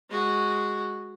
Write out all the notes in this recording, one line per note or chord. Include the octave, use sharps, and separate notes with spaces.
G#3 F#4